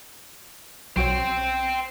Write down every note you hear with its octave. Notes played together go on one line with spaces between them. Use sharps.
B1 F#4 C5 C#5 G5